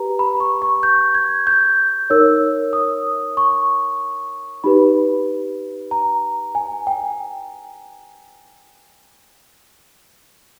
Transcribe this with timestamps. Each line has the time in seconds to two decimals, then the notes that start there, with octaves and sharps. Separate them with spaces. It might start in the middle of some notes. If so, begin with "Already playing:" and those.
Already playing: G4 B4 A#5
0.19 B5
0.40 C#6
0.62 C#6
0.83 G6
1.15 G#6
1.47 G6
2.10 D#4 A#4 C#5 E6
2.73 D#6
3.37 C#6
4.64 D#4 G4 B4 B5
5.91 A#5
6.55 G#5
6.87 G5